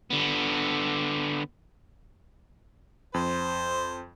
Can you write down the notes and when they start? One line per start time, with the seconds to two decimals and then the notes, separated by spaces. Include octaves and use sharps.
0.10 D3 B3
3.14 F2 C5